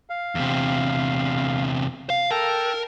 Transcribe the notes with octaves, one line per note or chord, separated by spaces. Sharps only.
F5
E2 C3
F5
A4 A#4 G5 A5